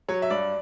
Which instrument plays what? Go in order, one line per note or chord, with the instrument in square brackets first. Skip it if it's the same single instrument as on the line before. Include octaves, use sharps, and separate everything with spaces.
[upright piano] F#3 C#5
E5
G2 D5